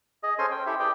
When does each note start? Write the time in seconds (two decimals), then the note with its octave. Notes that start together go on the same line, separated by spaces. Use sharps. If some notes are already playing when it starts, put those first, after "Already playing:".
0.23 G#4 D#5
0.38 C#4 A4 C5 G#5 C6
0.51 G5
0.66 E4 G4 A4 E5
0.79 G4 G#4 B4 D5 G5